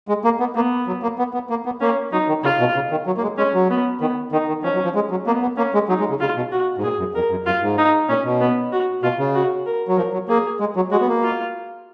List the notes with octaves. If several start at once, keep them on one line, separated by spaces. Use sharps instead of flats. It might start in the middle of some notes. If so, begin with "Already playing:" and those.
G#3
A#3
B3
A#3 B3
F#3
A#3
B3
B3
A#3
B3
A#3 C#4
F#3 D#4
D#3
C#3 F4
B2
C#3
D#3
F#3
A#3
G#3
G#3 C#4
F#3
B3
D#3 B3
D#3 D#4
D#3
F3 C#4
F#3
F3
G#3
F#3
A#3 B3
B3
A#3 C#4
G#3
F#3 D#4
G#3
C#3
C#3 F4
B2
F#4
G#2
A#2 G#4
F#2
F2 A#4
F#2
F#2 F4
G#2
D#4
A#2 C#4
B2
B3
F#4
B2 F4
C#3
F#4
A#4
F#3
F3 A#4
F#3
A#3 G#4
G#3
F#3
G#3 F#4
B3
A#3
F4